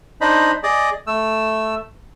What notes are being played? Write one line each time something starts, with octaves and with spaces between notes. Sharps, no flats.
D4 D#4 C5 D#5 B5
G#4 D5 D#5
A3 E6